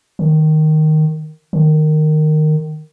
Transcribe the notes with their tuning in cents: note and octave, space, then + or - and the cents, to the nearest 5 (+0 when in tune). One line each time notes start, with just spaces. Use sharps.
D#3 -5
D#3 -15